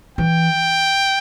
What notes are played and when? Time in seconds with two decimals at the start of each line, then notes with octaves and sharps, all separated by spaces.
0.18 E3 G5